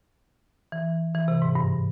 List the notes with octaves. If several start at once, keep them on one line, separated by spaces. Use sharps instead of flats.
E3
E3
C3
G#2
G2